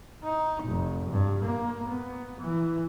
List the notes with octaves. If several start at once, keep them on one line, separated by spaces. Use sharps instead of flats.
D#4
F1
G2
A#3
B3
E3